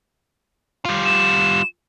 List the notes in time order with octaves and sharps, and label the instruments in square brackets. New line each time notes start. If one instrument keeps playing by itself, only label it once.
[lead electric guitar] G3 F4
[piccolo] E7